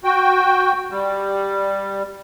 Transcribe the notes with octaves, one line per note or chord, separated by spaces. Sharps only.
F#4 G5
G3